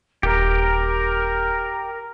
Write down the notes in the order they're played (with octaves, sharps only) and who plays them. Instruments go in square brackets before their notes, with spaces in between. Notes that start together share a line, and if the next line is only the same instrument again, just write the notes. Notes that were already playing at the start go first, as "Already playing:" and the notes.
[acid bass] D#1 [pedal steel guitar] G4 [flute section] A#4